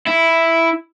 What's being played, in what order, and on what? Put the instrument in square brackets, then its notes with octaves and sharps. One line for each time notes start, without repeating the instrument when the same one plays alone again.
[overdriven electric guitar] E4